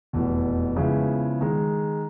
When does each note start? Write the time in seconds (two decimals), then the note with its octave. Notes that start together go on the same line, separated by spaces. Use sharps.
0.13 F1 E2 B2
0.76 C#3 F3 G#3 B3 E4
1.41 D#3 G#3